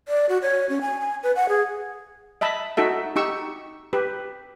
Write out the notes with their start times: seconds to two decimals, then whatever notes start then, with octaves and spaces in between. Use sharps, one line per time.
0.08 D5
0.29 F#4
0.42 C#5
0.69 C#4
0.81 G#5
1.01 G#5
1.23 B4
1.36 F#5
1.49 G#4
2.41 D#5 E5 A5 B5
2.77 D#4 F#4 A4 E5
3.16 D#4 G4 C#6 E6
3.93 G4 B4